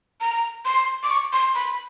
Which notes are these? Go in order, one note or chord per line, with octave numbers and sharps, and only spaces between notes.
A#5
C6
D6
C#6
C6
B5